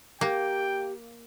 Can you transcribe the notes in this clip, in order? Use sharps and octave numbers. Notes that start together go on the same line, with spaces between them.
A#3 G4 G5